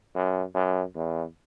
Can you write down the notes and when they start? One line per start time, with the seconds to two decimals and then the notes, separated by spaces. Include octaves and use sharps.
0.15 F#2
0.55 F#2
0.95 E2